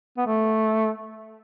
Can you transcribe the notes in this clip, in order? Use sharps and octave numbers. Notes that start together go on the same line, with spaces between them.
B3
A3